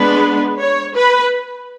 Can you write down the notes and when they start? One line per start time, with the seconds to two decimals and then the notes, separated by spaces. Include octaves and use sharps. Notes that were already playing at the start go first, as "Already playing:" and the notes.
Already playing: G#3 B3 D4 B4
0.58 C#5
0.95 B4